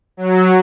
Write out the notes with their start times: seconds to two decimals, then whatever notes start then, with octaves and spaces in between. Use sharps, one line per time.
0.17 F#3